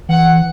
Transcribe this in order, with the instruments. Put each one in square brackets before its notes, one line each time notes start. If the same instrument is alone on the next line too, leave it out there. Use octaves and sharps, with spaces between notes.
[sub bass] E3 [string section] F#5